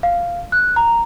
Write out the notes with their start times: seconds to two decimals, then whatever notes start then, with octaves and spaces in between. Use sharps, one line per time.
0.03 F5
0.52 F#6
0.76 A#5